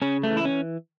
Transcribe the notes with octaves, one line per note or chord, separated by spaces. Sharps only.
C#3 C#4
A3
E3
E4
C#4